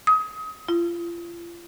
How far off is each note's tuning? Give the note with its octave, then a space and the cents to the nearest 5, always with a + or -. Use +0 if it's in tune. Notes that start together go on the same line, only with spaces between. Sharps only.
D#6 +25
F4 -35